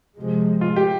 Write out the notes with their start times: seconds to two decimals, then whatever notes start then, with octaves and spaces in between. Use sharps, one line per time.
0.16 C3 F3 G#3
0.61 F4
0.76 G4